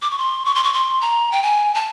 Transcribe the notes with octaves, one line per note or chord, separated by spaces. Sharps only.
D6
C#6
C6
C#6
C6
C#6
C6
A#5
G5
G#5
A5